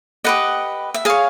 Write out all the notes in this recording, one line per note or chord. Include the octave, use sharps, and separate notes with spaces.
G4 B4 D#5 F#5
E5
G#4 C#5 F5